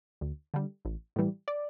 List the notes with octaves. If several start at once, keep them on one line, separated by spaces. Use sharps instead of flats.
D2
D3 G3
A1
A2 E3 G3
D5